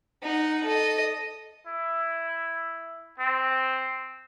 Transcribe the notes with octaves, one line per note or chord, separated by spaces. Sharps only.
D#4 F#5
A4 D#5
E4
C4